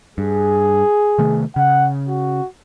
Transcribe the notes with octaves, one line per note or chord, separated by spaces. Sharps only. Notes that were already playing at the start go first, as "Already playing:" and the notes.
G2 G#4
C3 D#3 A3
C#3 F#5
F#4